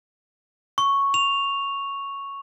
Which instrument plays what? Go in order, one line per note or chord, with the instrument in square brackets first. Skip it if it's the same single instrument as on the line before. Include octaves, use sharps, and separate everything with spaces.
[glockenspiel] C#6
F7